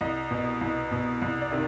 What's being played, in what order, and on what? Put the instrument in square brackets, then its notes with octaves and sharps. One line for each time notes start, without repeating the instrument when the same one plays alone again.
[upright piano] C2 D#5
B2
C2
B2
C2
D5
C3 D#3